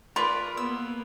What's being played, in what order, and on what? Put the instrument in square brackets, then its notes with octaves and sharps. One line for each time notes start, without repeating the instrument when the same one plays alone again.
[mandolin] F4 B4 D5 [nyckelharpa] A#4 [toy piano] B5
[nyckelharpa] A#3 B3 [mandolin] E6